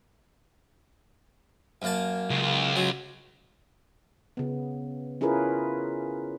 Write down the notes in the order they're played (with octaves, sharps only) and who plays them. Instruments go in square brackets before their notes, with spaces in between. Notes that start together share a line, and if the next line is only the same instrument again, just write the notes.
[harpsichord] F#2 A#3 A5
[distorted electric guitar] C#2
[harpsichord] F#3
[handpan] C#3 B3
C#4 E4 F4 G#4 A#4 B4